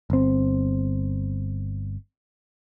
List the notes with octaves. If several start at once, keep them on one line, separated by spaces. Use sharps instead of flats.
G1 C4